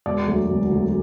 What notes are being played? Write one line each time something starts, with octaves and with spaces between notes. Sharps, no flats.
E1 D5
D2 D3 F#3 A3
E1
D2 D3 F#3 A3